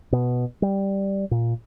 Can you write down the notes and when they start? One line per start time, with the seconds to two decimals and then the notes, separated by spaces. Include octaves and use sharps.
0.12 B2
0.62 G3
1.31 A#2